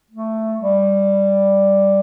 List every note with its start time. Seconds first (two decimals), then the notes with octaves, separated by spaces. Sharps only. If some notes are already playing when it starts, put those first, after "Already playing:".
0.11 A3
0.60 G3